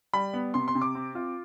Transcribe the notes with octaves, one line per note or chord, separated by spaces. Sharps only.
G3 B5
B3
C3 C6
C6
C3
D6
C4
F4